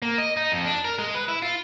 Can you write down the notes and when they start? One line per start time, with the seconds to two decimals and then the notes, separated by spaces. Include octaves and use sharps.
0.02 A#3
0.18 D#5
0.37 D#4
0.52 F2
0.65 D4
0.85 A#4
0.99 G#3
1.15 B4
1.28 E4
1.42 F4